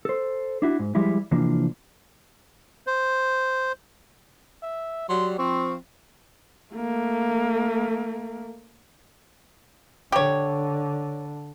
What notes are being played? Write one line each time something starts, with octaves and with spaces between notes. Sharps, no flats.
A4 C5
D4 E4 F#4
G#2
F3 G3 G#3 E4
C3 E3 F3 A#3 D4
C5
E5
F#3 G3 C6
F3 C4 C#6
A3 A#3
D3 G4 C#5